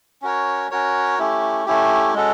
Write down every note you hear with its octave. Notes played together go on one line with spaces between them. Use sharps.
C#4 F#4 A#4 C#5
C#4 F#4 A#4 C#5
A3 C#4 E4 G4
A3 C#4 E4 G4
G#3 C#4 F#4 A4